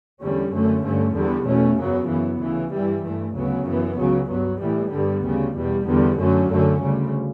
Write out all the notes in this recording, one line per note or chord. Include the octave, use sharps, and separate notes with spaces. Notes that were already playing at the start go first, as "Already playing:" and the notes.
E2 D3 G3 C#4
F#2 D3 A3 C#4
G2 D3 A3 C#4
E2 D3 G3 B3
B2 A3 C#4
F#2 C#3 F#3 B3
F#2 E3 B3
D2 C#3 E3
G2 E3 G3
G2 E3 A3
D2 C#3 F#3 B3
F#2 E3 B3
C#2 C#3 F#3
G2 F#3 B3
A2 E3 G3 B3
G2 D3 G3 B3
D2 C#3 G3
E2 B2 G3
E2 D3 G3 B3
F#2 D3 F#3 A3 C#4
F#2 D3 A3 C#4
D2 C#3 G3